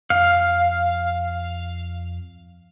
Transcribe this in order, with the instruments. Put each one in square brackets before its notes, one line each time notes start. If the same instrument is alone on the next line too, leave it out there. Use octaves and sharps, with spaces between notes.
[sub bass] F2 [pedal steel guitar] F5